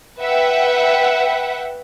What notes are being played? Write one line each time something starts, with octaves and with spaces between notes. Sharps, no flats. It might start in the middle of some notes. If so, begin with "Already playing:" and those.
B4 E5 F#5 G5